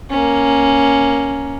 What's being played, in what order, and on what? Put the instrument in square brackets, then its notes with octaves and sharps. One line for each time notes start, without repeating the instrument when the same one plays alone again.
[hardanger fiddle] A#3 C#4